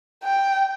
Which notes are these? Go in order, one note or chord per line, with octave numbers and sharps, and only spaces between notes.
G5